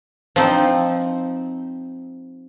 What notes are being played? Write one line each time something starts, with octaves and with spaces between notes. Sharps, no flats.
F3 C4 D#4